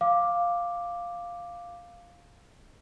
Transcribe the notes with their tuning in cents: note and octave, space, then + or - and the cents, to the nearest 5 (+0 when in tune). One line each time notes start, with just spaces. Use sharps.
F5 +0 D6 +0